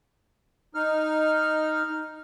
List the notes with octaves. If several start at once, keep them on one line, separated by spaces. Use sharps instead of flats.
D#4 F6